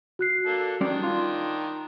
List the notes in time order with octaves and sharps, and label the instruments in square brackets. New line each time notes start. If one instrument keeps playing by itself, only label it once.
[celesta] F#4 F#6 C7
[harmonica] A#3 D4 A4
[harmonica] D#3 D4 [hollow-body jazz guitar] G3 C#4 D5
[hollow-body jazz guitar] F4 [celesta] C6